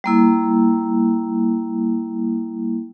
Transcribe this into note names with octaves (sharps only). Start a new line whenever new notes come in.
G3 A#3 E4